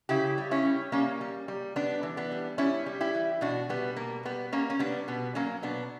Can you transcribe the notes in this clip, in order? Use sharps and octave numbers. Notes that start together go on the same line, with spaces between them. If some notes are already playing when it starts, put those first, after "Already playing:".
C#3 E4 G4
G3
C#4 E4
G3
G3 A#3 C#4
G3
G3
G3 B3 D4
E3
B3 D4
G3
G3 C#4 E4
G3
E4 G4
E3
B2 D4 F#4
G3 B3
B2 A#3
G3 B3
G3 A#3 C#4
C#4
G3 B3 D4
B2 B3
F#3 A#3 C#4
B2 B3 D4